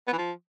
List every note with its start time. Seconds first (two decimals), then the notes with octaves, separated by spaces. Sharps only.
0.07 B3
0.13 E3
0.18 F3